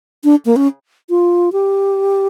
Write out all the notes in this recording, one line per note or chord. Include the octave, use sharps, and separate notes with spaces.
D4
A#3
C#4
F4
G4